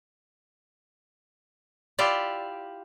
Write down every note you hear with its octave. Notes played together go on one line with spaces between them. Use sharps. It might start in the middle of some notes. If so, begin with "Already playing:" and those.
E4 F4 G4 D5